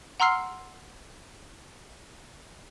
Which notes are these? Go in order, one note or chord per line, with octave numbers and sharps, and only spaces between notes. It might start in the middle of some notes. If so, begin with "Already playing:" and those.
F#5 A#5 C6 E6 F6 C7